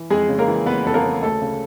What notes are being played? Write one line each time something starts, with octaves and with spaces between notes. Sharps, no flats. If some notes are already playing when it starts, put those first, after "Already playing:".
Already playing: E3
F2 G#3 G#4
C#3
A#3 A#4
E3
F#1 B3 B4
F2 A4
A#3 A#4
C#3
D2 A3 A4
C#3